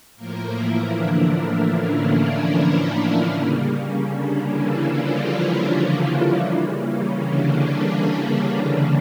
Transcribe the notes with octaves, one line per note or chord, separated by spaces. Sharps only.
A2 F3 A#3 A#4
E3 E4
D3 D4
A#3
C#4
C#3 G3 A#3
C#4
D3 D4
E3 E4
F3 F4
E3 E4
C#3 E3 G3 A#3
C#4
D3 D4
C#4
A#3
C#4